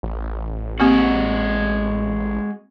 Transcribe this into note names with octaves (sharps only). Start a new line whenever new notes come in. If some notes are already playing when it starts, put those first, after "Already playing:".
A1
G#3 A#3 C4 F#4 G4